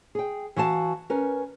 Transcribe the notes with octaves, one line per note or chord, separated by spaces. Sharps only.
G#4 G5
E3 F#4 F5 A5
C#4 A#4 B4